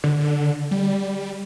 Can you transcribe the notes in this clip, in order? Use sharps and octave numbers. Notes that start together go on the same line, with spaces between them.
D3
G3